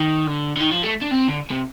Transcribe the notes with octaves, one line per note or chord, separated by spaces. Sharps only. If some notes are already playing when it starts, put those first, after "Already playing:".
Already playing: D#3
D3
D3
D#3
F3
A3
D4
C4
D3
C3